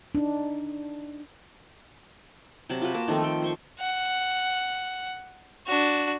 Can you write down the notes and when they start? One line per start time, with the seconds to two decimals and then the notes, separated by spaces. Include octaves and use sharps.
0.15 D4 D#4
2.69 C3 F#3 A5 B5
2.81 F4 F#4 B4
2.94 A#3 A5
3.08 D#3 F3 A3 C4
3.23 A4 G5
3.42 C5 C6 C#6
3.79 F#5
5.67 D4 F#4